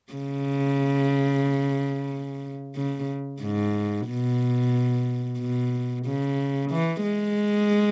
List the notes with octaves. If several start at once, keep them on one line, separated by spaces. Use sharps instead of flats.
C#3
C#3
G#2
B2
B2
C#3
E3
G#3